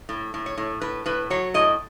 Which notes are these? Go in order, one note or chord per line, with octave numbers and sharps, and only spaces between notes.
A2
A2
C#5
A2
A2 B4
A2 B4
F#3 C#5
A2 D#5